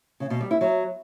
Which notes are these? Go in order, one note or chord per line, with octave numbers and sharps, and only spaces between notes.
C#3
B2
G3
E4
F#3